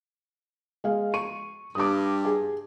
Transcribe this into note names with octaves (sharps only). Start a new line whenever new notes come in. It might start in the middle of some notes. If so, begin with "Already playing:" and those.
G#3 F5
C#6 D#7
G2 D6 D#6
G#4